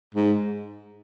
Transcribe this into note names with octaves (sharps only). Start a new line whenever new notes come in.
G#2